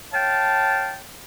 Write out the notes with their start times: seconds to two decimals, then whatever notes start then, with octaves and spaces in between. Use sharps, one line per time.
0.13 C#5 F5 G5 A5